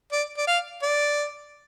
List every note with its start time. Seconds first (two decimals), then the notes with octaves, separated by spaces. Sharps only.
0.12 D5
0.38 D5
0.47 F5
0.82 D5